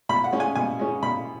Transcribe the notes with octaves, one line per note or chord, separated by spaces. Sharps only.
B2 B5
F#5
G#3 C#4
G#5
B2 G#5
G#3 C#4
B2 B5